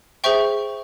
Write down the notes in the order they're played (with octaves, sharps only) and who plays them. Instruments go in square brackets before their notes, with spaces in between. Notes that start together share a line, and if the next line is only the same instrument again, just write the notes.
[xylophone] G#4 C5 E5 G5 C#6